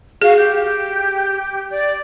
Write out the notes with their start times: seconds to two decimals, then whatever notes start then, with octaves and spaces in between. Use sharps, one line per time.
0.22 F#4 G#4 F5
0.36 G4 G6
1.70 D5